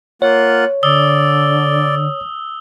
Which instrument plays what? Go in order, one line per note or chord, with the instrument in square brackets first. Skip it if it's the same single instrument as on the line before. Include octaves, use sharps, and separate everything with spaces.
[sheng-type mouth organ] A#3 F4 F#5 [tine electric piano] C#5
[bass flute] D3 [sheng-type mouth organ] D5 [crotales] D#6 E6 G7